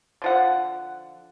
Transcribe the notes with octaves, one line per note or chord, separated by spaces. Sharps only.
D3 F3 F#5